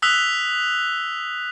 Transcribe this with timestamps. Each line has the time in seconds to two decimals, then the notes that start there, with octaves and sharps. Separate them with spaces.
0.02 D#6 E6 F#6 B6 F7 G7